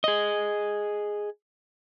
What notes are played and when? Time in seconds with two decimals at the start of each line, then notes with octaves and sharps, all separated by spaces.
0.04 G#4 D#5